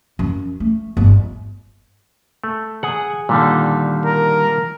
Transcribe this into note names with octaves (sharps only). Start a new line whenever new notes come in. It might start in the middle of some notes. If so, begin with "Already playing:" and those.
F#2
A3
G1
A3
G#4 F#5
A#2 D3 D#3 G3
A#4